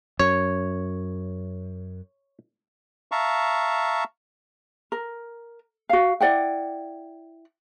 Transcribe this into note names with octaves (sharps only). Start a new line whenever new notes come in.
F#2 C#5
E5 F5 A5 A#5 C#6
A#4
F#4 F5
E4 D5 F#5 G5